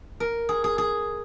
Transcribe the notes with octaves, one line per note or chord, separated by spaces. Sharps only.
A#4
G#4
G#4
G#4